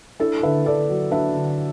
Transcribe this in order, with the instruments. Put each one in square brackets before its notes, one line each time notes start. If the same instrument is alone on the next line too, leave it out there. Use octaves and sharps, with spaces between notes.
[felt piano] D4 E4 A4
D3 B4 E5
D3 A4 D5
F#3
D4 B4 E5
D3